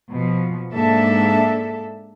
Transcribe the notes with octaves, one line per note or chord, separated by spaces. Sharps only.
B2 F3
G#2 A#3 D4 A4 E5